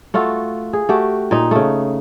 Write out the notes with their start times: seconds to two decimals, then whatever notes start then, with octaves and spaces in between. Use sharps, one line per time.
0.14 A3 F4 F#4 A4
0.73 G#4
0.89 A3 F#4 G4
1.31 A#2 D#4
1.51 C#3 A3